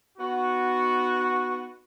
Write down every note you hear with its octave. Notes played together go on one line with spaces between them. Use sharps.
B3 D#4 F#4